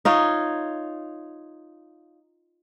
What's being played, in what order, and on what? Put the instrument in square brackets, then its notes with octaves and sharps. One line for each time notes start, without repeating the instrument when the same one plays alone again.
[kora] D#4 F4 C#5